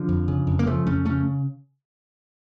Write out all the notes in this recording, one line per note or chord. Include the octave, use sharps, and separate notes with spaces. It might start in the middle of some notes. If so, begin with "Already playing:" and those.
Already playing: D3 F3
F2
C#3
F2
A#3
C#3 F3 A3
F2 A3 C#4
C#3 A3 C#4